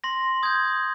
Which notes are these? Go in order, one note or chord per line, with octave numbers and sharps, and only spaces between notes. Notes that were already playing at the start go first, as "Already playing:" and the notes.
C6 A#6
D#6 G6 G#6